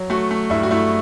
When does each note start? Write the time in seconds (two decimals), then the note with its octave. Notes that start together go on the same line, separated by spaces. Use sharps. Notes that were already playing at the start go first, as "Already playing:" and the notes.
Already playing: F#3
0.10 A3 F#4
0.31 A3
0.50 G2 E4
0.63 F#4
0.71 A3 E4